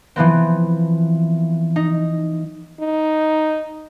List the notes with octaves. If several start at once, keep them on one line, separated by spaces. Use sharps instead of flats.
E3 F3 B3 C4
D#4
D#4